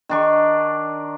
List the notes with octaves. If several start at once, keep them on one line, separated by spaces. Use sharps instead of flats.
D#3 D4 C#6